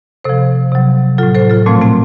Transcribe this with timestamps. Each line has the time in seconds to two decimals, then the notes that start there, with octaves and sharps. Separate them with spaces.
0.24 C3 F3 A4 C5
0.72 C3 F#3
1.18 F#3 F4 A4
1.23 A2
1.35 A4 C5
1.50 F4 A4
1.66 A#2 F3 A3 C4
1.81 A3 C4